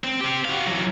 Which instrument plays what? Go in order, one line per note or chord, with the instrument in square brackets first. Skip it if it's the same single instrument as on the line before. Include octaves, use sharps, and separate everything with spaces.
[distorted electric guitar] C4
C4 G4
F#4 F5
E3 F#3